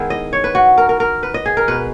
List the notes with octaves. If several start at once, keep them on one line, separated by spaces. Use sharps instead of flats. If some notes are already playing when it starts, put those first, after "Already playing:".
Already playing: D#3 G#3 B3 E4
D#5
C#5
B4
F#4
A#4
A#4
A#4
B4
D#5
G#4
A#4
B2 G#3 D#4 B4